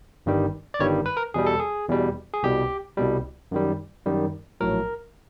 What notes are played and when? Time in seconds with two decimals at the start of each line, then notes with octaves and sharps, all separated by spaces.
0.26 G1 G2 D#3 G3
0.74 D5
0.80 G1 G2 D#3 G3 C#5
1.06 B4
1.17 A#4
1.34 E2 B2 G3 G#4
1.46 A4
1.60 G#4
1.89 E2 B2 G3
2.34 G#4
2.43 C2 B2 G3 G4
2.97 C2 B2 G3
3.51 F#2 D#3 G3
4.06 F#2 D#3 G3
4.61 A#1 A2 F#3 A#4